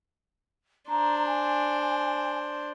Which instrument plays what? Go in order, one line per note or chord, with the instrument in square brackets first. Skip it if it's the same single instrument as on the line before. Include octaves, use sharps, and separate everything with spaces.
[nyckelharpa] D4 C5 [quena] A#5
[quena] G#5